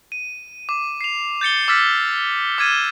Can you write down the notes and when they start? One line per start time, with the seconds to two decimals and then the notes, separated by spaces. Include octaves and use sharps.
0.12 D#7
0.69 D6
1.01 C7 F7
1.41 G6 A6 C#7 G7
1.68 D6 E6 F6 A6 B6 C#7
2.58 D6 F6 G#6 A6 D#7 E7